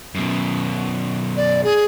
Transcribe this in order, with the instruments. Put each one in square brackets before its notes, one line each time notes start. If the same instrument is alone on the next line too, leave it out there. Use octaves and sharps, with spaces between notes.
[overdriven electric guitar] F#2 B2
[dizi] D5
G#4